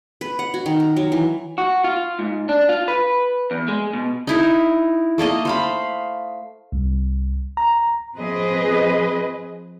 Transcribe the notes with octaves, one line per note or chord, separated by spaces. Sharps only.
B4
F#5
F#4
D#3
A#4
F#3
E3
F#4
F4
G#2
D4
F4
B4
E2
G#3
B2
D#4 E4 A#4
A3 A#3 A4 D#5
C5 F5 B5
C2
A#5
F3 C4 G#4 B4 D#5